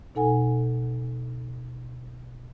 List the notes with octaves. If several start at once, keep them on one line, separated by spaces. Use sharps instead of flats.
B2 D#4 A4 F#5 G#5